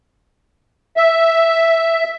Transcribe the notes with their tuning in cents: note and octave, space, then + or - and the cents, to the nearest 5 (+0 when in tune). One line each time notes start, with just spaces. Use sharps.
E5 +0